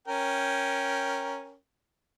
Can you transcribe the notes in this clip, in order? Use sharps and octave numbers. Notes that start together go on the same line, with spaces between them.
C#4 A#4 G5